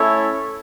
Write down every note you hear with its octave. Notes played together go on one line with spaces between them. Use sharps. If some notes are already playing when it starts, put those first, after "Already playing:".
Already playing: A3 C#4 E4 A4 C#5